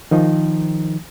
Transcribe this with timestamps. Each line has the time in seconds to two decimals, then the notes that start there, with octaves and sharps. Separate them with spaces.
0.11 D#3 F3 D#4